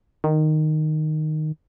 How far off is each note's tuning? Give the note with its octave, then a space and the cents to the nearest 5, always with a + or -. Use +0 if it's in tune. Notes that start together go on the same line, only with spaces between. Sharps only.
D#3 -10